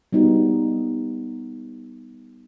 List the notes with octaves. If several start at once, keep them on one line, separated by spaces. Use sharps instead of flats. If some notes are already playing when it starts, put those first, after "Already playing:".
G3 B3 D#4 F#4